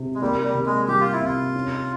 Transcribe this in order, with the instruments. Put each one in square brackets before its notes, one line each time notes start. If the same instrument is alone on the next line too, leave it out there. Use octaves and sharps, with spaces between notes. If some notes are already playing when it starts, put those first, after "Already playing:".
Already playing: [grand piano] C3
[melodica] G#3
[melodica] G3 [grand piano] A#3
[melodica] G3
[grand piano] C3
[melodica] G#3
[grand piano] G3 [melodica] G4
[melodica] F4
E4
[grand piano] C3 [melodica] F4
[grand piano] C#4